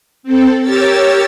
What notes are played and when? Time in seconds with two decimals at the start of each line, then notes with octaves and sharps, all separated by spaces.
0.23 C4 A4
0.61 G4 A#4 C#5 E6 A6